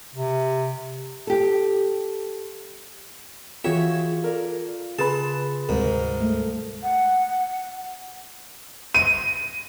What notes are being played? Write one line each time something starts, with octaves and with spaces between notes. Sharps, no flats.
C3
G4 A4
E3 F4 F#4 G#4 C#5 E5 G5
A4 A#4 D5
C#3 G#4 B4 A5 B5 C6
D2 G#2 C3 G3 A#4
A3
F#5
D#7